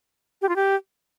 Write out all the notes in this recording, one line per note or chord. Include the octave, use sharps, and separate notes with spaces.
G4
F4
G4